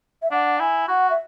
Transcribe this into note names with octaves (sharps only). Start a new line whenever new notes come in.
E5
D4 F#5
E4 G#5
F#4 F#5
E5